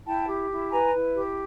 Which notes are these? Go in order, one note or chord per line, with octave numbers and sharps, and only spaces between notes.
E4 G5 A5
G4
E4
B4 G#5 A#5
E4
G4